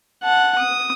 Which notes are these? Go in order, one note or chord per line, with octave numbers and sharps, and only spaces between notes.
F#5 A5
D#6